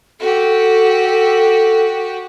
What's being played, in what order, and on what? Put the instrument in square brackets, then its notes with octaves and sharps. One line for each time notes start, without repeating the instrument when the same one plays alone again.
[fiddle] F#4 G4 [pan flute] A4